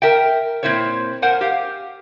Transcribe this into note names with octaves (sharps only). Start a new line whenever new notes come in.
A#4 E5 G5
A#2 D#3 C4 E4 C5 C#5
A#4 C5 F#5 G#5
G4 F5